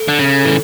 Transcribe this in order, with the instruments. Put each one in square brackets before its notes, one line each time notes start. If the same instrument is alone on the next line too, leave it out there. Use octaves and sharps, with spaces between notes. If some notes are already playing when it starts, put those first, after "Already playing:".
Already playing: [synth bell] A4
[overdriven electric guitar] D3
C#3
E3